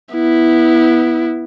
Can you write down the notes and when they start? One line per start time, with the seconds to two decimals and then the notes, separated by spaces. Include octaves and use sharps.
0.14 B3 E4